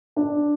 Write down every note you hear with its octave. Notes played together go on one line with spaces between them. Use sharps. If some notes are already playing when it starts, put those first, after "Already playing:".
D4